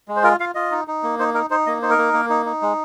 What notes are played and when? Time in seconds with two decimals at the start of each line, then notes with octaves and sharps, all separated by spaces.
0.08 G#3
0.16 C5
0.23 F4 A#4
0.40 F4 F5
0.55 F4 D#5
0.71 D#4
0.88 D#4
1.03 A#3
1.19 D#4 C5
1.34 D#4 A#4
1.50 D#4 C5
1.66 A#3 D#5
1.82 D#4 C5
1.90 A#4
1.98 A#3
2.14 A#3
2.30 D#4
2.46 D#4
2.62 G#3